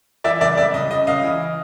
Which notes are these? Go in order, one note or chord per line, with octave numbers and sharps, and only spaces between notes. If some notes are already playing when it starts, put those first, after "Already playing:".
E3 D5 E5
C#2 D5 E5
C#2 D5 E5
C#2 D#5
C#3 D#5
C#2 D#5 F5
E3